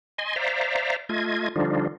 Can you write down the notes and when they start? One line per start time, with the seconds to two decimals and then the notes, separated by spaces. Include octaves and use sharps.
0.18 D#5 G#5 C6
0.36 C5 D5 E5 F5 A#5
1.09 A3 F4 D#5 G#6
1.56 D3 F3 G3 D4 D#4 F4